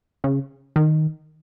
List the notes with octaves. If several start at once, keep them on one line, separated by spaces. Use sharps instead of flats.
C#3
D#3